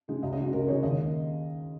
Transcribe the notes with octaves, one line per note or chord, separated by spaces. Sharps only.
C#3 G#3
C#2 D#5
D#5
C#3 G#3 F#4
C#2 A#4
C#3 G#3 C#5
D#2 D#5